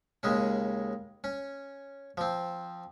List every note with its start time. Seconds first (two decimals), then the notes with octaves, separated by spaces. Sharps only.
0.23 D#2 C#3 G#3 C#4
1.24 C#4
2.17 F3 C4